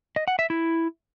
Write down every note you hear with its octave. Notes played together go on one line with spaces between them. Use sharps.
D#5
F#5
E5
E4